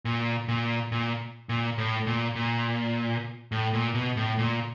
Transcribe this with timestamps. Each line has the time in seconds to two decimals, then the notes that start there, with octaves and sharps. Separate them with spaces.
0.05 A#2
0.48 A#2
0.92 A#2
1.49 A#2
1.78 A2
2.07 A#2
2.36 A#2
3.52 A2
3.74 A#2
3.95 B2
4.17 A2
4.39 A#2